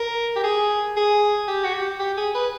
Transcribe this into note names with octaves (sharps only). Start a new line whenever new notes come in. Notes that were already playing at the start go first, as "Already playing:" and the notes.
Already playing: A#4
G4
G#4
G#4
G4
F#4
G4
G4
G#4
B4